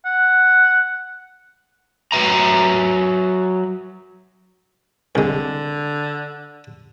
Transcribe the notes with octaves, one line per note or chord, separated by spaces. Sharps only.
F#5
F#3 B4 E5 A#5
C2 D3 G#3